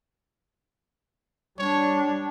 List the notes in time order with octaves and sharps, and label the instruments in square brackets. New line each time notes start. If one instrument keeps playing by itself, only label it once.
[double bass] G3 D4 [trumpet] C#5